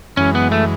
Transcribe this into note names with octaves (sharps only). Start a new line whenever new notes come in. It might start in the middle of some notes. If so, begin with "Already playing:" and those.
F#2 E3 G#3 C#4
B3
A3